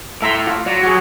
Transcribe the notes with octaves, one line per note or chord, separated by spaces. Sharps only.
A2 E5 A#5 C6
F4
F#3 D5
F#4 G#4